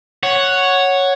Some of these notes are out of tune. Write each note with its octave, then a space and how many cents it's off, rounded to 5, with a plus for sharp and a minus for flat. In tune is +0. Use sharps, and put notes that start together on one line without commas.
C#5 +0 F#5 +0